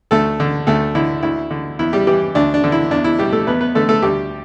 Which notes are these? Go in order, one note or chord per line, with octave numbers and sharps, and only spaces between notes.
D2 A3 A4
D3
D2 A3 A4
D3 E4
D2 E4
D3
E2 E4
G3 G4
E3 G3 G4
D2 D4
D4
D3
E4
E2 D4
E4
B2 G3 G4
A3 A4
E2 B3 B4
B3 B4
D3 A3 A4
A3 A4
D2 G3 G4